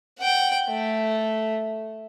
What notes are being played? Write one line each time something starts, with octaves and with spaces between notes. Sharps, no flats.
F#5 G5
A3